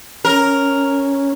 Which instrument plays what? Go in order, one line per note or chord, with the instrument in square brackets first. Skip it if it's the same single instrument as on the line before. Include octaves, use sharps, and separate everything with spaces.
[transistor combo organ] C#4 [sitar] A#4